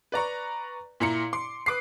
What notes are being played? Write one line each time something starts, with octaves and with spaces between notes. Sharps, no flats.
B4 D5 A#5 C#6
A#2 E4 A#5 C#7
C6 D6
B4 D6 D#6 C7